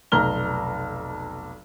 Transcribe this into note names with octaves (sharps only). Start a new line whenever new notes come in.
F1 B1 A#5 F6 G7